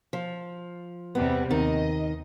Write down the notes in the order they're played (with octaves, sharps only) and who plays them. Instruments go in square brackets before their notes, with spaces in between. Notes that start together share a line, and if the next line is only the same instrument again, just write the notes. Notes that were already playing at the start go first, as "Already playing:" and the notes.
[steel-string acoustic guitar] F3
[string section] E2 C3 G3 [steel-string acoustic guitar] B3
[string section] D#2 D#5 [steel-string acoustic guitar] D#3